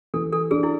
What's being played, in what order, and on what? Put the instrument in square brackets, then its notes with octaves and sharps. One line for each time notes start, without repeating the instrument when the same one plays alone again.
[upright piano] E3 [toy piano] A4
[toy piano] A4
[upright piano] D4 [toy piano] G#4
[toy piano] E4